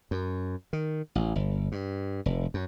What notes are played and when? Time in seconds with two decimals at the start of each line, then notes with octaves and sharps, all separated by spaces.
0.11 F#2
0.73 D#3
1.15 A1
1.36 G1
1.72 G2
2.26 F1
2.54 F#2